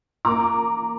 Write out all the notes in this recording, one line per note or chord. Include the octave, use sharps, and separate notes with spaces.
A#3 A#5 D6